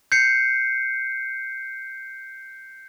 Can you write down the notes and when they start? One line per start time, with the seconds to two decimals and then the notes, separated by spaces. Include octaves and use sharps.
0.12 G6 C7 C#7